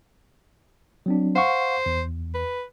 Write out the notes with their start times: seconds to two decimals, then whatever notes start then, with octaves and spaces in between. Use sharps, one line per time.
1.06 F#3 C4 D4
1.36 C5 F5 F#5 C#6
1.86 E2
2.34 B4